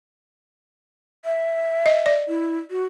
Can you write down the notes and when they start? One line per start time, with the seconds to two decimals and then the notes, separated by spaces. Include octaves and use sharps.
1.25 E5
1.86 D#5
2.06 D5
2.28 E4
2.70 F#4